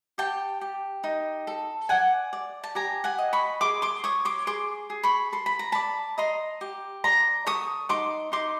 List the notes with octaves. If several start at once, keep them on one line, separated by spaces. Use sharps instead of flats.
G4 G5 A5
G4
D#4
A4
D5 F#5 G#5
D5
A5
G4 G#5 A#5
F#5 G#5
D#5
B5 C#6
G#4 C6 D6
C6 D6
C#5 C#6 D#6
C6 D6
G#4 C6 D6
G#4
B5 C#6
A4 C6
B5
A#5
D5 A5 B5
D#5 A#5 C6
G4
D5 A#5 C6
A4 C#6 D#6
D#4 C6 D6
D#4 C6 D6